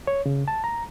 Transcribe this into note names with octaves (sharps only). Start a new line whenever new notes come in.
C#5
C#3
A5
A#5